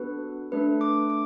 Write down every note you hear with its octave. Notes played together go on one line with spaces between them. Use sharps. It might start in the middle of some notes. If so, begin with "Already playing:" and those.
Already playing: B3 D4 F#4 A4 B4
A3 D4 A4 B4
D6
D6